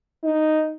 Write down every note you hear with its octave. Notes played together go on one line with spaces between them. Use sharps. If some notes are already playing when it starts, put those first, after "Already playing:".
D#4